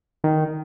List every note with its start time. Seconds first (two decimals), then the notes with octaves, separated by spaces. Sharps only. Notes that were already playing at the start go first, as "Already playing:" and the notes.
0.24 D#3